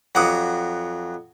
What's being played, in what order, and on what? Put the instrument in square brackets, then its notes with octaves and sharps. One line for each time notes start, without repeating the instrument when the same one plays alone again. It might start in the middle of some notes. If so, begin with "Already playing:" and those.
[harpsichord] F2 F#3 D6 [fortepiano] F#5 D#6